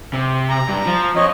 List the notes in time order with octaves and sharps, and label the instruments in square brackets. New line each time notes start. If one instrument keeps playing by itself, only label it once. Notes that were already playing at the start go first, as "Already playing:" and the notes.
[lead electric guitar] C3
[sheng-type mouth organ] A#5
[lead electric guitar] G2
F3
[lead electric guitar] F2 [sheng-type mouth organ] C#5 D#5